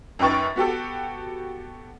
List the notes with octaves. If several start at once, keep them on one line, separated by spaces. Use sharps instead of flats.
F#2 D#4 B4 G5 C#6 A6
B3 F#4 G4 A4